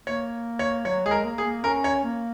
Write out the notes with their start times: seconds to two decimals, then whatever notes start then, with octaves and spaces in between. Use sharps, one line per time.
0.07 A#3 C#5
0.59 C#5
0.85 F#3 C#5
1.05 G#3 G#4
1.11 A#4
1.24 A#3
1.38 G#4
1.44 A#3
1.64 C#4 A#4
1.84 C#5
2.04 A#3